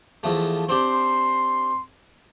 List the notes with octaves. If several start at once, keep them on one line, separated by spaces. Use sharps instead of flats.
E2 F3 A3
C4 D4 G4 C6